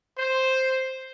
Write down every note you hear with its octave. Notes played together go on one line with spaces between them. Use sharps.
C5